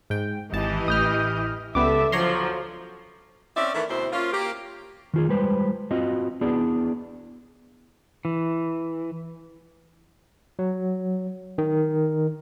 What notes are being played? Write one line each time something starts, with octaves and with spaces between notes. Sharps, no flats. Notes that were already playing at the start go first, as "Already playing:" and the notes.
G#2 G5
G#1 E3 G4 D#5 A5
A1 D#6 F6 G6
C#2 G3 B3 A4 E5 D6
D3 F3 F#3 C#5 A#5 C6
C4 C#4 D5 E5
D#3 E3 A3 A#4
D2 B2 C4 E4 C5
A#3 C#4 F4
A#3 G4
D#3 F4 G#4
G3 G#3 B4 C5
C4 F4 F#4 D#5
B3 D4 E4 G#4 D5
E3
F#3
D#3